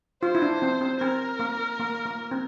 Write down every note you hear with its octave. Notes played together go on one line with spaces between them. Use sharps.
F4 C5
E4
D4
C4
C4
C4 A#4
A#3
A#3
A#3
C4